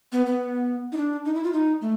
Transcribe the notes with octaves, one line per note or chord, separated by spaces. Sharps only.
B3
B3
D#4
D4
D#4
E4
F4
D#4
A3